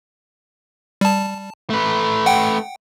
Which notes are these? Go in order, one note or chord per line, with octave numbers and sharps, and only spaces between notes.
G3 A5
A3 B4
F#5 G5